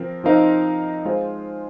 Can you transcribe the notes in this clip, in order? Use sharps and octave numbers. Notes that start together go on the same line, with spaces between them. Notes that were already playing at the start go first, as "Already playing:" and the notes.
Already playing: F3 C4 A#4
F3 C4 D#4 A#4 F5
G#3 F4 C5 F5